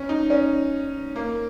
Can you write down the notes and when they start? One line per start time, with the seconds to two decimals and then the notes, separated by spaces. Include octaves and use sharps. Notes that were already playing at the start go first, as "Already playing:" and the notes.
Already playing: C#4
0.09 D#4
0.30 C#4
1.16 A#3